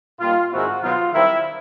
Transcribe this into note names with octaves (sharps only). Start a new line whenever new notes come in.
A#2 G3 A#3 D#4 F4
G#2 D#3 G#3 C4 E4 F#4
B2 F#3 B3 D#4 F4
D#3 G3 C4 E4